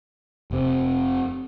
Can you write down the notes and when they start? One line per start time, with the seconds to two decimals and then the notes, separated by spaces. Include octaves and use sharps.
0.51 F1 C3